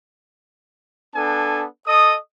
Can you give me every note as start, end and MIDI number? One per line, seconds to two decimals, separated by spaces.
1.15 1.64 59
1.15 1.64 62
1.15 1.64 69
1.15 1.64 80
1.86 2.16 69
1.86 2.16 75
1.86 2.16 87